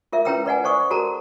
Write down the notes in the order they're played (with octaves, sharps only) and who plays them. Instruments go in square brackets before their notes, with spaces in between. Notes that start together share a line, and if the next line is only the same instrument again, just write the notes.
[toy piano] F4 A#4 E5
C#4 E4 B4 G5 A#5 E6
B4 D5 F#5 G#5
C5 D5 C#6 D#6
F#4 A4 A#4 A5 A#5